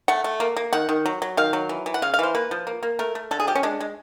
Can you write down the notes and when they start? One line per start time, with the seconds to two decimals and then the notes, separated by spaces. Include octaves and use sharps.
0.08 A3 F#5
0.24 A3
0.40 A#3
0.57 A#3
0.73 D#3 F#5
0.89 D#3
1.06 F#3
1.22 F#3
1.37 D#3 F5
1.53 F#3
1.69 E3
1.86 E3
1.94 F#5
2.02 C#3 F5
2.14 F5
2.19 E3 C5
2.35 A#3 B4
2.51 F3
2.67 A#3
2.83 A#3
2.99 A3 A#4
3.15 A3
3.31 D3 A4
3.40 G#4
3.47 F3 G4
3.55 C#4
3.63 G#3 D4
3.80 G#3